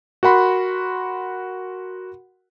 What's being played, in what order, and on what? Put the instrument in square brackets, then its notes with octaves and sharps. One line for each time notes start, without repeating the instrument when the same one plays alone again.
[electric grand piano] F#4 A#4 F#5 B5 C6